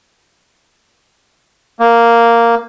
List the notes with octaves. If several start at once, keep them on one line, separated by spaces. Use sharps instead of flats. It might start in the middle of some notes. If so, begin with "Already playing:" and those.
A#3